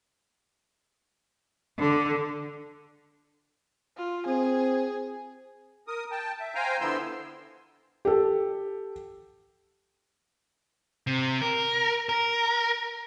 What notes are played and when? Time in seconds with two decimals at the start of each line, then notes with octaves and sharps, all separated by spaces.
1.78 D3
3.97 F4
4.27 C4 G#4
5.88 A#4 D#6
6.11 G5 A5
6.40 E5
6.55 C5 F5 G5 G#5 A#5
6.81 D3 F3 B3 E4 C6 E6
8.05 G4 A4
11.07 C3
11.42 A#4
12.09 A#4